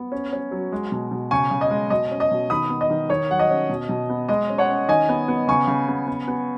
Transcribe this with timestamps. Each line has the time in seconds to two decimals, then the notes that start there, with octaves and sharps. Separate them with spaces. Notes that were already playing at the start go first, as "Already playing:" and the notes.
Already playing: B3
0.12 C#4
0.33 C#4
0.51 F#3
0.72 G#3
0.92 B2
1.11 B2
1.31 C#3 G#5 C#6
1.51 C#3
1.61 D#5
1.70 G#3
1.90 B2 D#5
2.11 C#4
2.20 D#5
2.31 B2
2.50 D#3 B5 D#6
2.70 B3
2.81 D#5
2.90 D#3
3.09 D#3 C#5
3.30 F#3 F#5
3.39 D#5
3.50 C#4
3.69 B2
3.89 B2
4.10 B3
4.28 G#3 D#5
4.49 C#4
4.58 C#5 F#5
4.69 C#4
4.88 D#3 D#5 G#5
5.09 B3
5.28 B3
5.47 C#3 G#5 C#6
5.67 C#3
5.88 B3
6.07 B3
6.28 B3